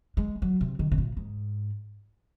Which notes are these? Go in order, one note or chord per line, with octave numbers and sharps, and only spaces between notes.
G#3
F#3
C3
D#3
C3
A#2
G#2